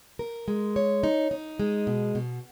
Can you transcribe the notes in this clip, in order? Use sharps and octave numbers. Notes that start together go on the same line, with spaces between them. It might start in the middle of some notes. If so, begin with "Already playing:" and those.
A#4
G#3
C#5
D#4
D#4
G#3
B2
B2